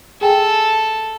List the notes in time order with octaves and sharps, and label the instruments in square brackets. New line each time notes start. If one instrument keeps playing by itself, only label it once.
[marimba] G#4 G5 G#5 [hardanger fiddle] A4